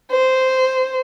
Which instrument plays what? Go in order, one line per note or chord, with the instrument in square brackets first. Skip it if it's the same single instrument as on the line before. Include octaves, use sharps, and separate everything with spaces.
[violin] C5